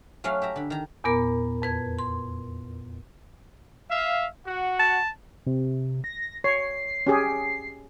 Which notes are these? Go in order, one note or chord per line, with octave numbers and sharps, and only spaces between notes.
F#3 A3 C#4 F#4 F5
G4 E5 A#5
D3 B5
D#3 A#5
E2 A#2 B3 A#4 A#5
F2 B4 G#6
C6
E5 F5
F#4 F#5
A5
C3
A#6
C#5 C7
C#4 G4 G#4